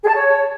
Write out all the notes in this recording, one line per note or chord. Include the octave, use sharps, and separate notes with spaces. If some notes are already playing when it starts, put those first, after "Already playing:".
G#4
A5
C#5